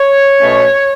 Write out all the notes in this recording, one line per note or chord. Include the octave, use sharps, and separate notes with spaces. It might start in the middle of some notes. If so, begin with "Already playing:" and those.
Already playing: C#5
B2 A3 C#4